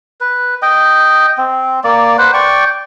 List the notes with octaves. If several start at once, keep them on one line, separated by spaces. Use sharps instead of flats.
B4
D#5 G5
C4
A#3 D5
B4 C5 F#5
D5 G5 C#6